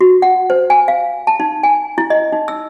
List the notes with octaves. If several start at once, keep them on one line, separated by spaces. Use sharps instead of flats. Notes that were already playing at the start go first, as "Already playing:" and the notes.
F#4
F#5
C5
G#5
F5
A5
D#4
G#5
E4
D#5
D#4
E6